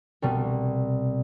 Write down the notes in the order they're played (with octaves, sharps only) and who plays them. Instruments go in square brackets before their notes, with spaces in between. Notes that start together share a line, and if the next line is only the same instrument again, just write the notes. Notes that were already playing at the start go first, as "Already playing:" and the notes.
[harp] C2 B2 G3